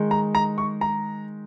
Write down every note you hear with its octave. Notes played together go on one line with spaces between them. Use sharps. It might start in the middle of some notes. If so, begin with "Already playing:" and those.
Already playing: D#3 G#3 D#4
A#5
A#5
C#6
A#5